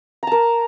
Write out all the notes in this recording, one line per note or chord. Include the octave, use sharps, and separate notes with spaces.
A#4 A5 A#5